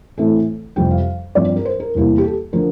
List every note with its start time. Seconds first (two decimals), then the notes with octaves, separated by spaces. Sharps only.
0.17 A2 E3 A3 C4 A4
0.76 F2 C3 G3 G5
0.91 F5
1.35 G2 F3 C4 D5
1.56 A#4
1.65 C5
1.80 A#4
1.95 E2 C3 E3 G3 A#3
2.18 G4
2.24 A4
2.53 D3 F3 A#4